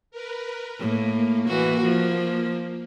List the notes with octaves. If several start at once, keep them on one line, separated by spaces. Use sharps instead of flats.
A#4 B4
A2 A#3
E3 F#4
F3